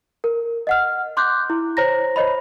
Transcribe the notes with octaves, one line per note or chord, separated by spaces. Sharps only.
A#4
D#5 F#5 F6
C6 D6 F#6 G6
E4
C5 C#5 A#5 A#6
C5 C#5 D#5 B5